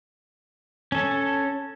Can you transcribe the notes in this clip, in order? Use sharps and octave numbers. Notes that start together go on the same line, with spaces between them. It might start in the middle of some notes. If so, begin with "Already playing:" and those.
C#4 A4